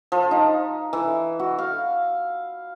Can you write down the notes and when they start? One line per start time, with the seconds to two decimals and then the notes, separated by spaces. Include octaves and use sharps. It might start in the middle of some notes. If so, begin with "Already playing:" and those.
0.12 F3
0.31 D#4
0.93 E3
1.39 F#4
1.59 F5